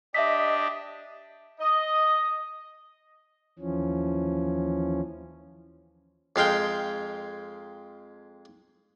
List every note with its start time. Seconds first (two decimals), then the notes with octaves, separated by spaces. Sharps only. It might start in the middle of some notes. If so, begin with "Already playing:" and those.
0.14 D4 G4 D#5 E5 B6
1.61 D#5
3.59 D#2 E3 F3 C#4
6.36 F2 G#3 F5 G5